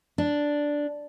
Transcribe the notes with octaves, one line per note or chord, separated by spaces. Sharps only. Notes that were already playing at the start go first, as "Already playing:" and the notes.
D4